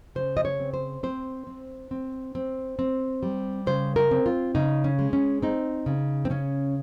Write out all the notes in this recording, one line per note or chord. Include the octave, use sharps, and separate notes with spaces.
C#3 C5
D#5
C#5
C4
C5
C4 C5
C4
C4
C4
C4
G3
C#3 C5
A#4
C4
F4
C#3 D#4
C#4
G#3
C#4
C4 D#4
C#3
C4
C#3 C#4